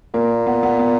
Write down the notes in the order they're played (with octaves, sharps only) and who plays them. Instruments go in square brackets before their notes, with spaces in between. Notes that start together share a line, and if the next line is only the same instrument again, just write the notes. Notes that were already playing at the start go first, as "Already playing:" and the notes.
[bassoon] A#2 [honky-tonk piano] A#3
[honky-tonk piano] B3
B3
B3